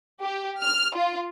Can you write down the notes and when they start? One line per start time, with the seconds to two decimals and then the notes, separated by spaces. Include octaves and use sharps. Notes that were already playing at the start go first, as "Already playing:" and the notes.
0.22 G4
0.61 F6
0.95 F4